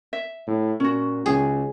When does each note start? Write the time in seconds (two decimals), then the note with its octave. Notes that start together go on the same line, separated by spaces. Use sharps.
0.13 E5
0.47 A2
0.80 A#2 C#4 F#4
1.26 C#2 G#4